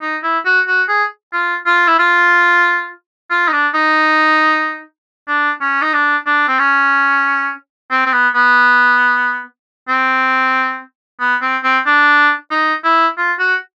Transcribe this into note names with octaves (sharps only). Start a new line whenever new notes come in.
D#4
E4
F#4
F#4
G#4
F4
F4
E4
F4
F4
D#4
D4
D#4
D4
C#4
D#4
D4
D4
C4
C#4
C4
C4
B3
B3
C4
B3
C4
C4
D4
D#4
E4
F4
F#4